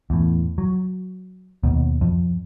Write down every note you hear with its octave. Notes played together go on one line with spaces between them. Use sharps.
E2 A2
F#3
D#2 B2
F2